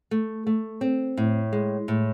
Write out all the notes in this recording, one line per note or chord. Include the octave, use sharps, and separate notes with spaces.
A3
A3
C4
A2
G#3
A2